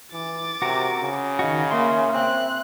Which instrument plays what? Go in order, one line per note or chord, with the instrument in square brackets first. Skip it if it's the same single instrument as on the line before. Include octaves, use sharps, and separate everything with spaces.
[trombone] E3 [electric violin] D6 A6
[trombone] C3 [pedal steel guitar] F#4 A#4
[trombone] C#3
[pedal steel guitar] D#3 F#4 [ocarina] D#5
[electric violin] A#3 [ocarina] E5 [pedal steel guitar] C6
[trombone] C4 [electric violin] F#6